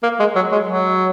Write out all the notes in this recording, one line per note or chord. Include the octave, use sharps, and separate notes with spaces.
A#3
G#3
F#3
G#3
F#3